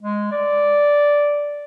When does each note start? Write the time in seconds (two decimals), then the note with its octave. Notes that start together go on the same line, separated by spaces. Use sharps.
0.01 G#3
0.31 D5